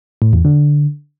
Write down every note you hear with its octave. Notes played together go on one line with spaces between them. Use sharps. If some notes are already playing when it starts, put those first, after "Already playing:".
A2
E2
D3